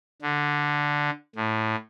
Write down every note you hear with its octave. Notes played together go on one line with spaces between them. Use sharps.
D3
A2